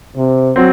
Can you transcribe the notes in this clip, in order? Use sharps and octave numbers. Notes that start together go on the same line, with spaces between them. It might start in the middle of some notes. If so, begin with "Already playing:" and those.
C3
F#3 C4